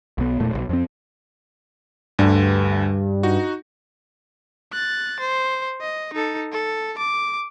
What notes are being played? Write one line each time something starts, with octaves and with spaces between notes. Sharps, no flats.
B1 B3
E1 A#2 A3
E1 B1
F2 C4
D2 G2 D3
D#4 F#4
F#6 A6
C5
D#5
D#4 A4
A4
D6